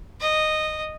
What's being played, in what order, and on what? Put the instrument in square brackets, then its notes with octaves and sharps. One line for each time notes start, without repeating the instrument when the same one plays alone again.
[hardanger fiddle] D#5